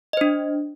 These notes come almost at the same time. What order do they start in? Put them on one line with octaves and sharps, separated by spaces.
D#5 C5 D4